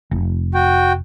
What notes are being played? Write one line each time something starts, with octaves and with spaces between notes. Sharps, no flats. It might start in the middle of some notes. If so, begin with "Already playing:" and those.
F1
F#4 G5